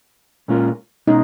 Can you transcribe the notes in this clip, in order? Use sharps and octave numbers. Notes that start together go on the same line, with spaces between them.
A#2 G#3 C#4 F4 A#4
B2 G#3 C#4 D#4